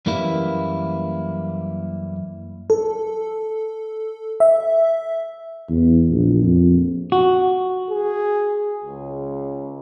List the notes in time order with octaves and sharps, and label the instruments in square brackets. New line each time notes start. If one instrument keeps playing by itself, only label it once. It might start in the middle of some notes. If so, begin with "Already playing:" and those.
[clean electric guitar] F#2 E3 G3 A#3 E4
[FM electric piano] A4
E5
[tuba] E2
A#1
F2
[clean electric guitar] F#4
[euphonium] G#4
C#2